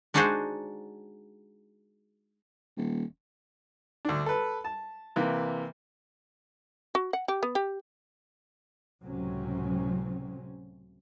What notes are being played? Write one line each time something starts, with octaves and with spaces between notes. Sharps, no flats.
G#3 D4 D#4 F#4 G#4 C5
D#1
D2 D4
A4 B4
A5
C3 E3 A#3
F#4
F#5
G4
B3
G4
C#2 A2 C3 F#3 C4 C#4